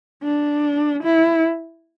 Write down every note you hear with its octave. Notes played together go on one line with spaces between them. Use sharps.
D4
E4